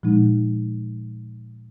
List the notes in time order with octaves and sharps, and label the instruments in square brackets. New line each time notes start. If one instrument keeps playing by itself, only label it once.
[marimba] A#2 F3 G#3 D#4